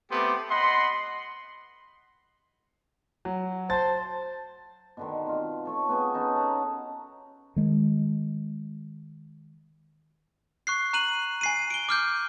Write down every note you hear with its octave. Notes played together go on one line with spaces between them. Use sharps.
A3 B3 C4 G4 C6 D6
D#5 F#5 B5 C6
F#3
C5 A5 A6
B2 D3 D#3
C4 F4
A4 C#5 C#6
B3 C4 G#4 C#5
B3 C#4 D#4 A4
A4 F#5 A5 A#5
D#3 G#3
C#6 F#6 C7
A#5 F#6 D#7 F#7
G#5 C7 D#7
D7 G7
D6 F6 G6